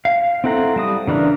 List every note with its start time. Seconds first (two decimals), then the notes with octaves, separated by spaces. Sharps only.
0.05 F5
0.44 C4 E4 A4 F#5 A#5
0.76 G3 A5 D#6
1.07 C#3 E3 D4 A#4